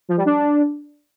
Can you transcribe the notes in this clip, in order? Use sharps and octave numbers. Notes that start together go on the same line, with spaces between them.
F3
G3
D4